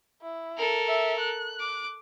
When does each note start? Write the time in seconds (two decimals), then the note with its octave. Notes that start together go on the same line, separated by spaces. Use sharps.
0.22 E4
0.58 A4 A#4
0.87 E5
1.20 F#6
1.60 D6